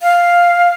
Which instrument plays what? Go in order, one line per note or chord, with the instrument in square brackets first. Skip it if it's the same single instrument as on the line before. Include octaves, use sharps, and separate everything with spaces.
[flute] F5